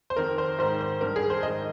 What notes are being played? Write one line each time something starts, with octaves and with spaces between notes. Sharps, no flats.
C5
F2 D#3 A#4
C5
G#2 D#3 C5
C5
G2 D#3 A#4
G#4
C5
G#2 D#3 D#5